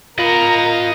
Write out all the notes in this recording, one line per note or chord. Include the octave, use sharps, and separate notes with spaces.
F4 A#4 D#5 A#5 B5